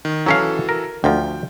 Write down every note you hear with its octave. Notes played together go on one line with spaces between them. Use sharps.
D#3
E3 F#3 C#4 F#4 A4 F5
A#4
D2 F3 G5